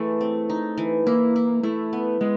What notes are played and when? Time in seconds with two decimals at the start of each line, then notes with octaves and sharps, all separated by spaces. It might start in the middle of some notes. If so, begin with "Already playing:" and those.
Already playing: E3 G#3 A3
0.21 C4
0.50 D#4
0.78 E3
1.07 A#3 E4
1.36 E4
1.63 A3 E4
1.93 B3
2.21 G#3 B3